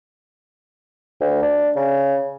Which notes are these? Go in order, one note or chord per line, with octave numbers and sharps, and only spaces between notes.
D2
D4
C#3